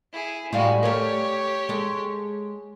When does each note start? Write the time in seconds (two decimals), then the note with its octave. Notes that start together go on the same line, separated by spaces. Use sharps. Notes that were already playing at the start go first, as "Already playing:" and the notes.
0.13 E4 G#4
0.53 A2 G3 G#3 F#4 F5
0.83 A3 G4 A#4 C#5
1.69 G#3 A4